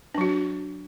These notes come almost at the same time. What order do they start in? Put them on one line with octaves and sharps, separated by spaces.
D4 F#3 F#4